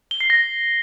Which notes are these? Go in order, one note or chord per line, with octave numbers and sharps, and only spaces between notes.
G7
C7
A#6